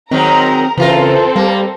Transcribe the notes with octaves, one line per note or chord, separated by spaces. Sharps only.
D#3 F#3 G#3 C4 A#4 A#5
C#3 E3 C4 F4 A4 A#4 C5
G3 A#3